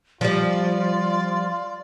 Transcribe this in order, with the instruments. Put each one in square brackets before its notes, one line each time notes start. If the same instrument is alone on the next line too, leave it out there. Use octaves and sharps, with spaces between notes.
[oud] F3 G3 [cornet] F4 [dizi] D5